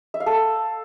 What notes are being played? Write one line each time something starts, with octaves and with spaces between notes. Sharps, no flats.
E5
F5
A4